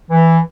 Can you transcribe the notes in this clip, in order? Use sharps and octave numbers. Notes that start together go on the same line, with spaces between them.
E3